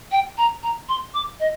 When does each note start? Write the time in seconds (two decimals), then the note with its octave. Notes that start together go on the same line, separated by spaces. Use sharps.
0.12 G5
0.38 A#5
0.63 A#5
0.89 C6
1.14 D6
1.40 D#5